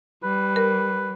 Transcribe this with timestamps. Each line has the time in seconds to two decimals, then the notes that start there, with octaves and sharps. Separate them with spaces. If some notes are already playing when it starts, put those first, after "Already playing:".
0.24 G3 B4
0.56 A#4